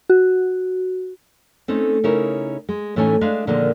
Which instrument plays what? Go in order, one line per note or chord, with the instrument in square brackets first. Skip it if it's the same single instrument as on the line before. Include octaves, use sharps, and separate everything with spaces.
[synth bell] F#4
[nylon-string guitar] A3 C4 C#4 D#4
C#3 C#4 D#4 E4 A#4 C#5
G#3
A2 E3 A3 C#4 D#4 G#5
G#3 D4 E5 F5
A#2 D3 D#3 F3 G#3 A#3